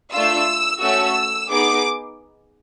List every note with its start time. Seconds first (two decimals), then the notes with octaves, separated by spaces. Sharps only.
0.13 A3 D4 F4 E6
0.81 A3 C#4 F#4 A4 E6
1.50 B3 D#4 G#4 D6